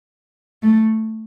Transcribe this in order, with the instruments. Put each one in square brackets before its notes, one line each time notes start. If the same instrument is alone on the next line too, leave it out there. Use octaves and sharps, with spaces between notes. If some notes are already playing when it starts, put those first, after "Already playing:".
[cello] A3